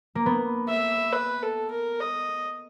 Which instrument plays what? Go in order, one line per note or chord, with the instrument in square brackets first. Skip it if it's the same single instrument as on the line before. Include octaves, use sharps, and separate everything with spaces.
[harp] A#3
B3
[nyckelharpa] E5
B4
A4
A#4
D#5